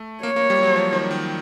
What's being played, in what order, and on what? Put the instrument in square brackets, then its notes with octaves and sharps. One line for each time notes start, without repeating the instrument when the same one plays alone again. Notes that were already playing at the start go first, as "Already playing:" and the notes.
Already playing: [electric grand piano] A3
[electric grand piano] A#3 [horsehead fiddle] C#5
[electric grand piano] A#3
G3
F#3
F3
D#3
D#3